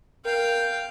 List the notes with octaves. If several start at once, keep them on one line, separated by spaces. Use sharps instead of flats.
A#4 F5 G5